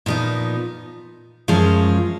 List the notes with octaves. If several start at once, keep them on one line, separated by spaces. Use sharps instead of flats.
A#2 F3 B3 D#4
F#2 F3 G#3 C#4 F4